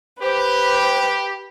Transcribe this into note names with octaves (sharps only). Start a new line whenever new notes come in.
G4 B4 C5